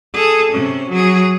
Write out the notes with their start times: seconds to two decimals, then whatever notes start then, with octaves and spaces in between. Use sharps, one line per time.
0.14 G#4 A4
0.52 C3 C#4
0.90 F#3 G#4